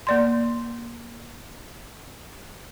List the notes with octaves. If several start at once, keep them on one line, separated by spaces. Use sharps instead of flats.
A#3 D5 C6